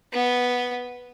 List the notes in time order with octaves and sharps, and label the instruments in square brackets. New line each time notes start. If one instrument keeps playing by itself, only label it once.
[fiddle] B3